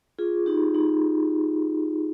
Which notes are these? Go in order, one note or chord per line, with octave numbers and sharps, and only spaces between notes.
F4 G#4
D#4 G4
D#4